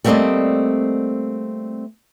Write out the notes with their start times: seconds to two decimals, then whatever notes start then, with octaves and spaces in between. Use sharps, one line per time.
0.04 G3 A3 A#3 C4 D5 D#5